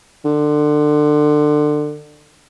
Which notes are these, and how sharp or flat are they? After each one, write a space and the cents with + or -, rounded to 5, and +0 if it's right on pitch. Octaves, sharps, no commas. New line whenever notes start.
D3 +25